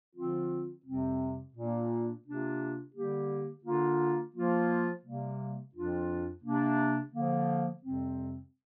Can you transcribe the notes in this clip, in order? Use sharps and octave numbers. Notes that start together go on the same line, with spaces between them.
D3 F3 C4 F4
F2 C3 G3 C4
A#2 A#3 D4
C3 A#3 D4 F4
D3 G3 A#3 G4
D3 A#3 D4 F4
F3 A#3 F4
C3 G3 A#3
F2 F3 D4 F4
C3 A#3 D4
D3 F3 A#3
F2 C3 G3 C4